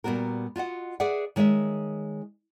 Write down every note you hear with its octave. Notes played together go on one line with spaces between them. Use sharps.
A#2 G3 B3 F#4 A#4
F4 F#4 D#5 F#5
G#4 B4 D5 E5 F#5
D#3 G#3 C#5 D5 E5